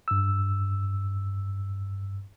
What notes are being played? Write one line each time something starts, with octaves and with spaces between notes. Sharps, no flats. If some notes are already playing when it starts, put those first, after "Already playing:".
G2 E6